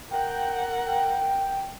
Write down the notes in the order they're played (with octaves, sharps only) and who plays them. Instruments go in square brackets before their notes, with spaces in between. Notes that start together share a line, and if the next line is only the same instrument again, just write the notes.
[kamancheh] A#4 F#5 [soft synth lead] G5
[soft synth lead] G5